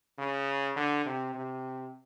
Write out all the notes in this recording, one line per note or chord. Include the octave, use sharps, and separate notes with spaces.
C#3
D3
C3
C3